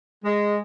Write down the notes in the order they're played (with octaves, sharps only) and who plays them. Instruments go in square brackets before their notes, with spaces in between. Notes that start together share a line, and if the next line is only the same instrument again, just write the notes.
[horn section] G#3